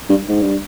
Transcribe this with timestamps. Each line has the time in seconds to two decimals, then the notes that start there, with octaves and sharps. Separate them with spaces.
0.09 G2
0.29 G#2
0.41 G2